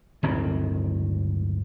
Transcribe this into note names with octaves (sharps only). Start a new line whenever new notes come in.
D1 G1 D#3 C4